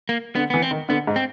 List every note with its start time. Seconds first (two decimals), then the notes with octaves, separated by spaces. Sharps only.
0.09 A#3
0.35 D3 B3
0.50 E3 B3
0.62 C4
0.71 D#3
0.89 D3 B3
1.07 G#2
1.16 C4